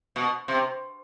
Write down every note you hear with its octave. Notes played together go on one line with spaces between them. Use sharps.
B2
C3